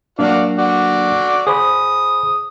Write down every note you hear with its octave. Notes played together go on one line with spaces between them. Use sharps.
F#3 A#3 D4 F#4 D5 F5
F#4 D5
G#4 C5 B5 D#6